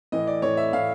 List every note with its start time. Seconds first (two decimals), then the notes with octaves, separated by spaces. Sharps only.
0.12 A2 E3 D#5
0.27 D5
0.42 A2 E3 C#5
0.57 E5
0.73 A2 E3 F5